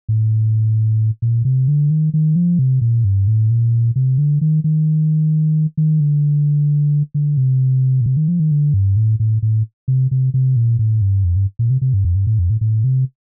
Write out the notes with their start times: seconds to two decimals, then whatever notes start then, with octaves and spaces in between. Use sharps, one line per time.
0.09 A2
1.22 A#2
1.45 C3
1.68 D3
1.90 D#3
2.14 D#3
2.36 F3
2.59 C3
2.81 A#2
3.04 G2
3.27 A2
3.50 A#2
3.96 C3
4.18 D3
4.41 D#3
4.64 D#3
5.77 D#3
6.00 D3
7.14 D3
7.37 C3
8.01 A#2
8.06 C3
8.17 D#3
8.28 F3
8.40 D#3
8.51 D3
8.74 G2
8.97 A2
9.20 A2
9.42 A2
9.88 C3
10.11 C3
10.34 C3
10.56 A#2
10.79 A2
11.02 G2
11.24 F2
11.36 G2
11.59 A#2
11.70 C3
11.82 C3
11.94 G2
12.05 F2
12.15 G2
12.27 A2
12.39 F2
12.50 A2
12.61 A2
12.84 C3